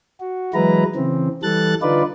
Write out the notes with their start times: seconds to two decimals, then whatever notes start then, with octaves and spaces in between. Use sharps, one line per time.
0.20 F#4
0.54 E3 F#3 G#3 E4 B4 A#5
0.96 C#3 E3 C4
1.43 E3 G3 A4 F#6 A6
1.82 D3 D#4 F4 B4 D5